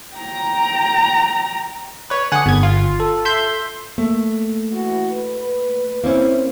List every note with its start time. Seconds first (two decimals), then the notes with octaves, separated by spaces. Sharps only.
0.16 G5 A#5
2.10 B4 C#5
2.32 D3 F#5 G#5 D#6
2.46 G1 B3 G#6
2.63 F4
3.00 A4
3.25 E5 C6 G6
3.98 A3 A#3
4.72 E3 F#4
5.12 B4
6.04 A#3 C4 C#4 E4